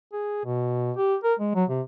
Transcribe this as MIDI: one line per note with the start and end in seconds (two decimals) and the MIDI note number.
0.13 0.42 68
0.45 0.92 47
0.97 1.16 67
1.24 1.34 70
1.39 1.53 56
1.55 1.64 54
1.69 1.82 48